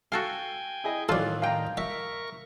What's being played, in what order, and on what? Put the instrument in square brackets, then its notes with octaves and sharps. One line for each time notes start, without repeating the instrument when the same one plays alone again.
[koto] F#4 A4 F5 [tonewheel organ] G5 G#5
[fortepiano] E4 G#4 D#5
[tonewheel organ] A2 D#3 [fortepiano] E3 F#3 D5 [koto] F4 [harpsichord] A4 C5
[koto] F3 G5 [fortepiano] F5 A#5
[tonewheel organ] A#4 C#6 [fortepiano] E5 [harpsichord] F5